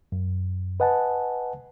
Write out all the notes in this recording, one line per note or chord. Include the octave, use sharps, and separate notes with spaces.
F#2
B4 D#5 F#5 G#5 A5